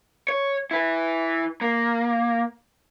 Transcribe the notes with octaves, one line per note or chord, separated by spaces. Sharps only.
C#5
E4 B4
A#3